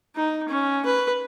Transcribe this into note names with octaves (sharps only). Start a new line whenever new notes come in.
D#4
C#4
B4